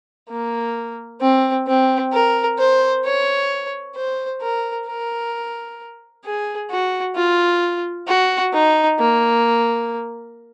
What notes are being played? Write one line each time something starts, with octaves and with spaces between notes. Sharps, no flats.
A#3
C4
C4
A#4
C5
C#5
C5
A#4
A#4
G#4
F#4
F4
F#4
D#4
A#3